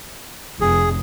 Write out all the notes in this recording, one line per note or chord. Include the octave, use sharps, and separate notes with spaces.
F1 G#4